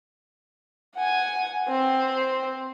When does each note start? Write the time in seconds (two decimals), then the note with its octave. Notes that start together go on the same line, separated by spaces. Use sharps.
0.95 F#5 G#5
1.68 C4